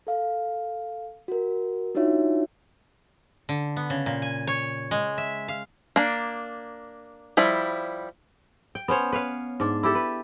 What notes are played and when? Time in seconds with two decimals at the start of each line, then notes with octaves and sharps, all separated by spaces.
0.07 A4 F5
1.28 F#4 A#4
1.95 D4 D#4 F4 F#4 C#5 E5
3.49 D3
3.77 B3
3.90 C#3
4.06 A#2
4.22 G#5
4.47 C#5
4.91 G#3
5.18 E5
5.48 F5
5.96 A#3 D4
7.37 F3 G3 E4
8.75 G5
8.88 B3 C#4 C5 C#5
9.13 B4 C#5 F5
9.60 G#2 D4
9.83 E4 G4 A4
9.95 B4